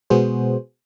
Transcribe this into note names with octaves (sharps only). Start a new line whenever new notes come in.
B2 G#3 B3 F#4 G#4 C5